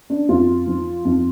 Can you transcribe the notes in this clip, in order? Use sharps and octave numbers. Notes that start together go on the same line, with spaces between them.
D4
F2 F4
F3
F2